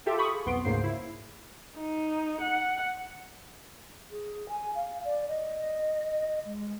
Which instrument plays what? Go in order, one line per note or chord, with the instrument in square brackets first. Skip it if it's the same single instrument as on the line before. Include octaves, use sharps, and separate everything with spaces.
[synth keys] F4 G4 A4 E5 F5
B5 C#6 D#6
G#4
B1 F2 B3 C6 D7
D2 G#2 C#3 A#3 C5 C7
E4
[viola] D#4
F#5
[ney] G#4
G#5
F5
D5
D#5
G#3